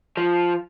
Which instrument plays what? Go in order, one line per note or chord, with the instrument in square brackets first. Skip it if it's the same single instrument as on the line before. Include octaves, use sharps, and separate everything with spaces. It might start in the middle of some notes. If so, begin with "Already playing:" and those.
[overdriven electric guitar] F3